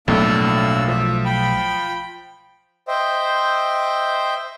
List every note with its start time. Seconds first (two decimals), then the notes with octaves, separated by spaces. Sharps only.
0.08 B1 F2 A2 F#3 A3 A#3 D4 E6
0.88 F3 E5
1.25 G5 B5
2.88 C5 D#5 E5 G5